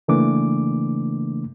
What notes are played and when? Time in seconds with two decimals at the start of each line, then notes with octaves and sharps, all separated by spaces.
0.08 C#3 E3 A3 A#3 D4 D6